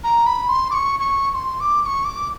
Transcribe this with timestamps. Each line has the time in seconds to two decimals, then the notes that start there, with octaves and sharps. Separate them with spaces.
0.04 A#5
0.26 B5
0.48 C6
0.71 D6
0.74 C#6
1.00 C#6
1.31 C#6
1.34 C6
1.60 D6
1.82 D6
1.86 C#6
2.05 D6